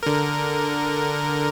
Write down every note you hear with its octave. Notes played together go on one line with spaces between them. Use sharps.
D3 A#4